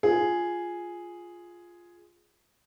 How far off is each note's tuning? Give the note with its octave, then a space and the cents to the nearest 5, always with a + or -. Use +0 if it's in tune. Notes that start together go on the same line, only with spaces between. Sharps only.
F4 +0 G#4 +0